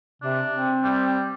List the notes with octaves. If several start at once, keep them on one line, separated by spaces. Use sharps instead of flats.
C3 D4
C4
G3